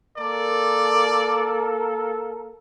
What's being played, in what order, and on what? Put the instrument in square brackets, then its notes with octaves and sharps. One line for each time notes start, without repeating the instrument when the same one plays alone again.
[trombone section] A#3 A4 A#4 [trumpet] D5